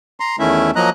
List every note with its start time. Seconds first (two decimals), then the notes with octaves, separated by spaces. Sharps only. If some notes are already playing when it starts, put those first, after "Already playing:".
0.20 A#5 C6
0.39 E2 D#3 A3 C#4 E4 E5
0.76 F3 F#3 A#3 D#5 A#5 F#6